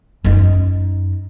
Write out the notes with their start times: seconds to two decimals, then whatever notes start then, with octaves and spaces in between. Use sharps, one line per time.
0.24 F#2 D#4